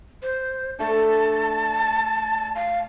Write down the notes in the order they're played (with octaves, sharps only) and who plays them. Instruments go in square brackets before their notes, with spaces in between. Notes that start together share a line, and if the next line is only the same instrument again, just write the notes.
[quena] C5
[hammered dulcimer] A3 D4 [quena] A5
[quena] F5